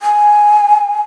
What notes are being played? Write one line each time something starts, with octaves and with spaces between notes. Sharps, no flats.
G#5